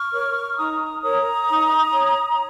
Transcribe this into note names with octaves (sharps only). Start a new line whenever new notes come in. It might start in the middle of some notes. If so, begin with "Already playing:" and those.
Already playing: C#6 F6
A#4 C#5
D#4 A#5 D#6
A#4 C#5 A#5 D#6
D#4
C#5